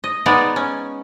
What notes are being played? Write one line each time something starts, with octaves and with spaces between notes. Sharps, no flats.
D#5
G#3 B3 D#4 D5
C#4